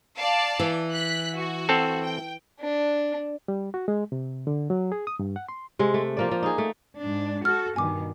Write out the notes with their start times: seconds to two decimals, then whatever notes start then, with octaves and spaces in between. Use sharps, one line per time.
0.18 D5 F5 A5
0.59 E3
0.93 F#6 B6
1.35 F#4
1.69 C4 A4
2.04 G5
2.60 D4
3.48 G3
3.74 F#4
3.88 G#3
4.12 C3
4.47 D3
4.70 F#3
4.92 G#4
5.07 D#6
5.19 G2
5.36 F#5
5.49 C6
5.79 C3 G#3
5.94 A3
6.17 F3 A#3 D5
6.31 F3
6.43 D#4 G#4
6.58 A3
7.00 G#2 D4
7.45 F#4 A4 F6
7.76 G2 B2 D#3 G#5 D6